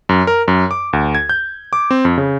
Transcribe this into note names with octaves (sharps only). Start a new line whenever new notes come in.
F#2
A#4
F#2
D6
D2
G#6
G6
D6
C4
F2
C#3